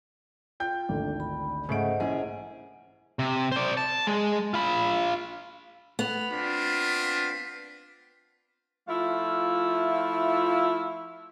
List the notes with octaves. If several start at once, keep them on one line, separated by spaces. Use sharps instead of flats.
F4 G5 G6
G#1 D2 D3 D4
B5
G#2 C#3 A3 C5 D#5 F#5 D7
A#1 E3 C#4 G#4
C3
C5 D5
A5
G#3
F4 B5
B3 F7
C4 D4 F4 B6
F3 A3 E4 F4 F5